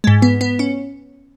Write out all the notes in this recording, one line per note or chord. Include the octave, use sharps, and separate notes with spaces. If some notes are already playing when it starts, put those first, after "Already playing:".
G#2 G#3
B3
B3
C#4